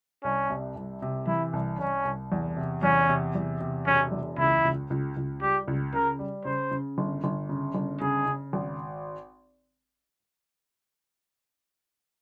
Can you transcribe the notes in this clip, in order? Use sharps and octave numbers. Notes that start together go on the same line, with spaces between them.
C2 C#4
C3
C2
C3
E3 E4
C2
C2 C#4
C2
E2
C3
E2 C#4
C3
E2
C3
E1 C#4
E2
C#2 E4
C#2
C#2
C#2
G3 G4
C#2
C#3 A#4
G3
C#3 C5
C#3
G1
G1
C#3
G1
C#3 G#4
C#3
G#1